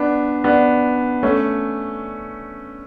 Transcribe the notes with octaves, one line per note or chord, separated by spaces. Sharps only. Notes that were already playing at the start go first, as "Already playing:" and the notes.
Already playing: B3 D4
B3 D4
A3 C#4